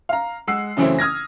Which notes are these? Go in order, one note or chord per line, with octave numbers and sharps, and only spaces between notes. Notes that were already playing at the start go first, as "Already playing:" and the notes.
F5 A#5
G#3 F#5 E6 C7
F#2 C#3 E3 A3 C4 E4
D#6 F6 G#6 A#6